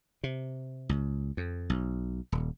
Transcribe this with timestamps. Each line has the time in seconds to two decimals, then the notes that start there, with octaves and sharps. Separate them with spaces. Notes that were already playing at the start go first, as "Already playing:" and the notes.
0.23 C3
0.89 C#2
1.37 F2
1.70 B1
2.32 D#1